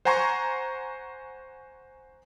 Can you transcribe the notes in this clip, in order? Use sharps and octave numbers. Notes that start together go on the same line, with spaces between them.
C5 F#5 G#5 A#5 C6 C#6